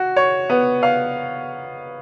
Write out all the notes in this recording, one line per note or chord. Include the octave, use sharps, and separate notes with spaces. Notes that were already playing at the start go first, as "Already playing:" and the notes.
Already playing: F#4
C#5
B3
F5